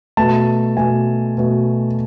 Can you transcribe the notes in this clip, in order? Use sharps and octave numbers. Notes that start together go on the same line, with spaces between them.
B2 A3 A5
B2 A3 G#5
B2 A3